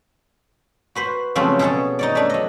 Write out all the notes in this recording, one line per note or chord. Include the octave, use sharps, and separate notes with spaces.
F#4 B4 C5
C#3 F3 F#3 A3 B3 C4
B2 G#4 C#5 A5
D#4 C#5 D5
A3 D4
F#3 D#5